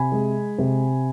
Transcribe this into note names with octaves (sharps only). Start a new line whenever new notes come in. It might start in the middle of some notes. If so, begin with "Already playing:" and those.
Already playing: C3 G#5 B5
G#3
C3